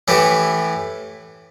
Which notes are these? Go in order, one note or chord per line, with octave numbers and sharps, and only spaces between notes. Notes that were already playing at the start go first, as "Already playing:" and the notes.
A2 E3 A3 E4 G4